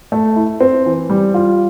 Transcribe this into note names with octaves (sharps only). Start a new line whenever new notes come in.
A3
E4
C4
E3
G3
F4